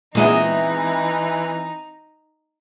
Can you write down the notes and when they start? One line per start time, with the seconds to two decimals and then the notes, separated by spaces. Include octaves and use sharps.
0.15 A#2 E3 G#3 B3 C4 D#4 D#5 E5